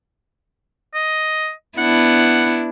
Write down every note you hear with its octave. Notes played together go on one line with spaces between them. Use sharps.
D#5
B3 D4 E4 F#5